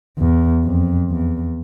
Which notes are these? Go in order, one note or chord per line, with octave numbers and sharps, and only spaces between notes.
E2
F2
E2